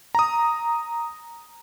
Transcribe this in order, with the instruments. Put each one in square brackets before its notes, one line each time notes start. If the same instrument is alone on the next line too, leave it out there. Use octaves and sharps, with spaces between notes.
[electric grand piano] A#5 D#6